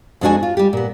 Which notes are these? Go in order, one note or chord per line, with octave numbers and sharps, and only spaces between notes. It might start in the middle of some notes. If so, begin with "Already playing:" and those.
F2 G#3 D4 F4 F#4 G#5
F4
G3 G4
A#2 B3